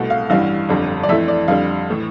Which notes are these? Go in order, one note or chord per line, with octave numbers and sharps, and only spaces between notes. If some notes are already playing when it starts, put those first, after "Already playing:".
Already playing: C2 B2 A3
F5
A1 G2 E3 G3 F5
G1 F2 D3 G3
D5
F2 E3 A3 E5
D5
F2 D3 G3 F5
A2 E3